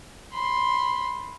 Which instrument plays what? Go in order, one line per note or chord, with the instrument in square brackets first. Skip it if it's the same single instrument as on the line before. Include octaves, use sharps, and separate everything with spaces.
[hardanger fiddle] B5 C6